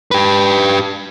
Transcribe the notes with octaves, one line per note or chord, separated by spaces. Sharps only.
G4 B4